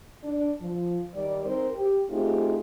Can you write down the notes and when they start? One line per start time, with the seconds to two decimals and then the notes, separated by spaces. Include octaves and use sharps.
0.23 D4
0.61 F3
1.14 D#3 G3 D5
1.45 C4 D#4 A#4 C5
1.73 G4
2.10 A3 C4 D#4 F4 G4 G#4